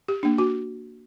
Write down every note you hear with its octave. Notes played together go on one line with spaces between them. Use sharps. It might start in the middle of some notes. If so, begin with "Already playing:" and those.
G4
A#3 D4
F#4